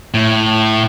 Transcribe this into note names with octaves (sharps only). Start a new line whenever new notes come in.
A2